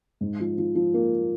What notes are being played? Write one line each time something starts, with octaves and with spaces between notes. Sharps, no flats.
G#2
F3
F3
F3
A#3